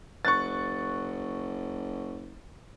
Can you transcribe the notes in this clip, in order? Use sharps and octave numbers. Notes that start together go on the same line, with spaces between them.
F#1 C#6 F#6 A6